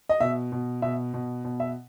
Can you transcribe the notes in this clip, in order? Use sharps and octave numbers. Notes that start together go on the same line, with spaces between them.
D#5
B2 E5
B2
B2 E5
B2
B2
E5